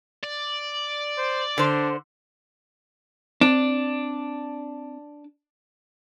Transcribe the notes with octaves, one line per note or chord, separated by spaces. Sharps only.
D5
C5
D3 D4 C5
C4 D4